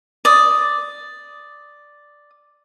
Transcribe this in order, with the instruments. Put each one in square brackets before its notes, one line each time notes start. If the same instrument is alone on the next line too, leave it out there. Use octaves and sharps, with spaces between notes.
[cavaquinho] D5 D#6